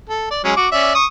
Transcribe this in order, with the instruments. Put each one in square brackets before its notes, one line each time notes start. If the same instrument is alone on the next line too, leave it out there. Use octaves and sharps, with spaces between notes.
[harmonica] A4
D5
F#3 G#3 C#4
F#4 D6
C#4 D5 E5
C#6 D#6